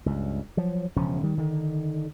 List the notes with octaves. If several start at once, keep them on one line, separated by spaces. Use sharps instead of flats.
C#2 G2
F3 F#3
E1 C#3 F3 C#4
D#3 G3
D3 D#3